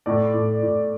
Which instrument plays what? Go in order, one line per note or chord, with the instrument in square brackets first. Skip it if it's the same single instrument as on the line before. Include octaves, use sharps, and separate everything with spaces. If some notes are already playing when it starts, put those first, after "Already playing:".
[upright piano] A2 D5
A2
A2